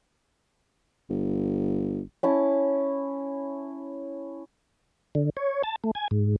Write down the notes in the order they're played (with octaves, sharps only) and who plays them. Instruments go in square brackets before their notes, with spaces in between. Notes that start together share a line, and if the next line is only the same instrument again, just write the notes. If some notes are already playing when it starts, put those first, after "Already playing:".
[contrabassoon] G1
[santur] C#4 E4 A5
[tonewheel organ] D3
C#5
A5
A3
G#5
G#2